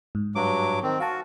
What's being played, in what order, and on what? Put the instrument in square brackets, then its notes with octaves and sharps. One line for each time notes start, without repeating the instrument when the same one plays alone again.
[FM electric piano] G#2
[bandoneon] G2 F#3 D6
D#3 C4
[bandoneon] F#4 [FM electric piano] F5 A5